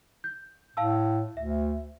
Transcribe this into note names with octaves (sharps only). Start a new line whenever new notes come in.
G6
A2 F5 A5 E6
D2 E5